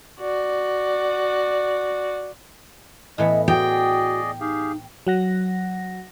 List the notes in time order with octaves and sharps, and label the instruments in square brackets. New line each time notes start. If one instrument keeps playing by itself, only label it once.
[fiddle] F#4 D5
[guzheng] A2 E3 B3 [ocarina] D#5
[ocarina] F#4 [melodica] G#4 D5 D#5 [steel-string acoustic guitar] G5
[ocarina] D#4 [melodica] G4 G#4 F5
[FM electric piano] F#3 F#5 A#6